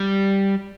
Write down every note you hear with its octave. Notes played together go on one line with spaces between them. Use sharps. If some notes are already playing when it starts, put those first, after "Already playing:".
Already playing: G3